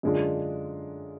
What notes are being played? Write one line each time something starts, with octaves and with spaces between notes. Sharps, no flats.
F#2 D3 G#3 D4 F4